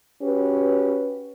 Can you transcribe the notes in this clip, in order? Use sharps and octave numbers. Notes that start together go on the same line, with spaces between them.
C#4 F#4 G4 B4